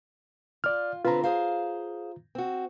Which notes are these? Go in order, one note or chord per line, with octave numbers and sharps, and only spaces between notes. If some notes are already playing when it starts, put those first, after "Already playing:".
F4 D5 F6
D3 C4 F4 B4 A#5
G#4 C5 F5
C4 F#4